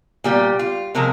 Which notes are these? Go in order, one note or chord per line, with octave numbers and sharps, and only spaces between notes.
A#2 G3 G4
F4
C3 F3 G#3 A#4